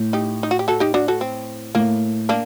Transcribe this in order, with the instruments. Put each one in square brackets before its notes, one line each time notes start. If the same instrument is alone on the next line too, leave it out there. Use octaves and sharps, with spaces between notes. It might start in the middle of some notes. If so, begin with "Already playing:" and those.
Already playing: [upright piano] A2
[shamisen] D#4 G4
D#4
F#4
G4
F#4 A4
D#4 G4
D4 F#4
F#4 A4
C4
[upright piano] A2 [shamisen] A#3
[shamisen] A#3 D4